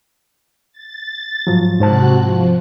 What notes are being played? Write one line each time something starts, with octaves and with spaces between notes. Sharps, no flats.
A6
G#2 F3 F#3
G#2 C3 F#4 C5 A5 F#6
F3